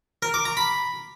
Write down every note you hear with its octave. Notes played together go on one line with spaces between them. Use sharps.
A#4
D6
A#5
B5